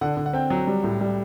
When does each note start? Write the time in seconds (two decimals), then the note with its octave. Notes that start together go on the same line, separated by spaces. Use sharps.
0.01 D3 F#5
0.17 D3
0.26 F#5
0.33 C4 G5
0.50 F#3
0.67 G3
0.84 A2
1.01 G3